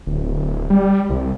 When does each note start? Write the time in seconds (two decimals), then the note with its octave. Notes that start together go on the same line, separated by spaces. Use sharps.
0.07 D1
0.70 G3
1.10 C2